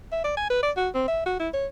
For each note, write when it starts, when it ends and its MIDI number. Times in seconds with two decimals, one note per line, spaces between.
0.12 0.24 76
0.24 0.33 74
0.37 0.46 80
0.50 0.62 71
0.63 0.71 74
0.77 0.89 66
0.95 1.03 60
1.08 1.22 76
1.26 1.36 66
1.40 1.49 64
1.54 1.67 73